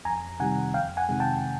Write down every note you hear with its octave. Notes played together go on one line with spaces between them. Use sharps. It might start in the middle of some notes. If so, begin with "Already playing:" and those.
F2 G#5 A#5
C3 D#3 G3 F#5 G#5
F2 F5 G5
F#5 G#5
C3 D#3 G#3
G5 A5